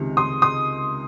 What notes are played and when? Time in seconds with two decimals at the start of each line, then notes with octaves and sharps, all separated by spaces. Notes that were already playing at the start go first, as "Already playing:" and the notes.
Already playing: C#2 C3 D#3
0.17 C6 D#6
0.42 C6 D#6